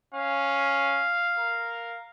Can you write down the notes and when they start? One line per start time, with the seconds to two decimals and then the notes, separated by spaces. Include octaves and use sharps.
0.14 C#4 F5
1.38 A#4